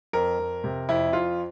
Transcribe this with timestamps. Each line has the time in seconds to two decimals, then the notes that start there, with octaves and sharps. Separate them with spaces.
0.13 F2 A#4
0.39 F2
0.64 C3
0.89 F2 E4
1.13 F2 F4